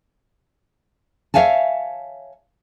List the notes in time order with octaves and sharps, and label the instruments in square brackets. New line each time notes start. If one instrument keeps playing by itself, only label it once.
[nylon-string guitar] C#5 E5 F5 G#5 A5